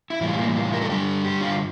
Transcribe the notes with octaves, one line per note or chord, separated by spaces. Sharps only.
E4
A2 E3 G3 F4
A#3
F4
A#4
A4
G2 D3 G3 G4
G4
F4